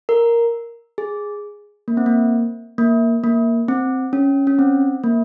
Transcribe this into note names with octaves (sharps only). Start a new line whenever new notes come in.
A#4
G#4
A#3
C4
A#3
A#3
A#3
C4
C#4
C#4
C4
A#3